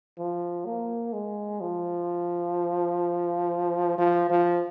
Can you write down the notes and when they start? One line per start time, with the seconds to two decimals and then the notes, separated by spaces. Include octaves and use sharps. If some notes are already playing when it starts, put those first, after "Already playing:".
0.18 F3
0.66 A#3
1.13 G#3
1.61 F3
3.99 F3
4.30 F3